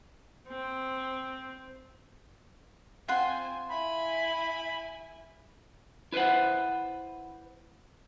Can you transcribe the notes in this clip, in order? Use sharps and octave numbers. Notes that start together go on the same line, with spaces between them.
C4
C4 F4 F#5 G#5 C6
E4 G#5 B5
E4 B4 C5 E5 F#5